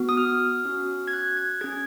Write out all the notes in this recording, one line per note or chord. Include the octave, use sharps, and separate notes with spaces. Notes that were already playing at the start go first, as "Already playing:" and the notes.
Already playing: B3 F#4
D#6
F6
C#4 F#4
G#6
F#6
G#6
C#4 G#4 G#6